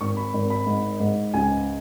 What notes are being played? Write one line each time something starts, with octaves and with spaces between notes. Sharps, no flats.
G#1 C#6
B5
G#1
B5
G#2
G#2
C#2 G#5